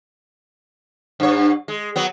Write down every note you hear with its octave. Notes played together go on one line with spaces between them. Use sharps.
G2 C#5
G#3
F#3 B3